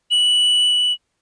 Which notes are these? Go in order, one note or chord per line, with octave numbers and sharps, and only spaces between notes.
F#7